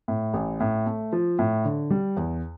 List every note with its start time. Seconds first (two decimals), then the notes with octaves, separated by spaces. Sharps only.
0.08 A2
0.34 A1
0.60 A2
0.86 A3
1.12 F3
1.39 A2
1.65 D3
1.90 G3
2.17 E2